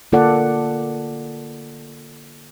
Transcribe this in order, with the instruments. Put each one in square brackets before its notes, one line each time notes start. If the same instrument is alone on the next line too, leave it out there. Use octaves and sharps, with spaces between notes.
[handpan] D3 A#3 F4 A4 D5 F#5